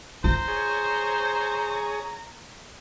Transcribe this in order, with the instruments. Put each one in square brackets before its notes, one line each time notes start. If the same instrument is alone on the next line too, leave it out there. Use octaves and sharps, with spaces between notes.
[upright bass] F4 [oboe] C5 [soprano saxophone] A#5
[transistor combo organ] G#4 C#5